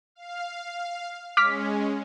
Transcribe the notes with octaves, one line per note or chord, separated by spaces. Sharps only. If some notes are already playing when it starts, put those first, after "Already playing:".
F5
G#3 C#4 D6 F6 B6